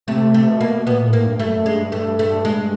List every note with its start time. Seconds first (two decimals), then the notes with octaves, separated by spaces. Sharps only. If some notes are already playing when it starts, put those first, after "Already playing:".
0.07 C3 A3
0.34 A3
0.47 B2
0.60 A#3
0.87 A#2 B3
1.07 A2
1.13 A#3
1.26 G2
1.39 A3
1.46 F#2
1.65 G2 G#3
1.92 A3
2.19 A3
2.45 G#3